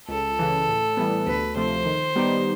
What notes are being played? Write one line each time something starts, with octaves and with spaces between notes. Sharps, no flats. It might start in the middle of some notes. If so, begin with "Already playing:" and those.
C#2 A4
C#3 E3
A2
E3 G3 B3
D2 B4
C3 F3 A3 C5
D#3
G3 B3 D#4 G4